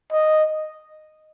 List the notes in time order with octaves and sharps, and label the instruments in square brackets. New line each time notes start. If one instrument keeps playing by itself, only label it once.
[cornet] D#5